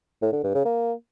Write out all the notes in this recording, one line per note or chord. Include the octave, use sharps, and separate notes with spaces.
A2
D3
G2
C#3
A#3